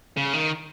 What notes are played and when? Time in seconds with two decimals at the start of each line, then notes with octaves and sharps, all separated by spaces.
0.17 C#3
0.33 D#3